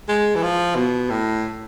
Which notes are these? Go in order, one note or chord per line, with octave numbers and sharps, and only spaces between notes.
G#3
E3
F3
B2
A2